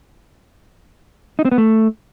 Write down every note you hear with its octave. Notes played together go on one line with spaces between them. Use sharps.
D#4
C4
B3
A3